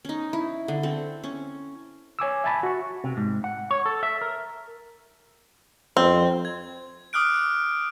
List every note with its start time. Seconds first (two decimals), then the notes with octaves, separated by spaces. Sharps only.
0.05 C#4 D#4
0.33 E4
0.68 D3
0.83 C4 A4
1.23 C#4 C#6
2.19 C#5 G#5 D6 E6
2.44 E5 G#5 A5 B5
2.63 F#4 C#6
3.04 C3
3.17 G#2
3.44 F#5
3.71 C#5
3.86 A4
4.03 E5
4.21 A#4
5.97 F2 C4
6.45 G#6
7.13 D6 D#6 F6 F#6 D7